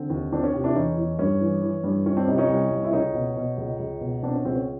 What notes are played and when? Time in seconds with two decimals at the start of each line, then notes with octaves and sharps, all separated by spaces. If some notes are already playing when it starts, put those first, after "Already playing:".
Already playing: D3 C4
0.10 D#2
0.32 D#3 C4 D4
0.43 C#4
0.53 C3
0.64 D4 E4
0.75 E2 C#4 D#4
0.97 E2
1.19 G2 C#4
1.41 E3
1.63 E3
1.84 G2
2.06 D#3 C#4
2.17 C4 D4
2.28 C3 C#4 D#4
2.38 C#4 D#4
2.49 C2
2.70 C2
2.84 E4
2.93 C#2 C#4 D#4
3.14 B2
3.36 B2
3.58 C#2
3.80 C#2
4.01 B2
4.23 B2 C4 D4
4.34 C#4
4.45 C#2 C4
4.55 C#4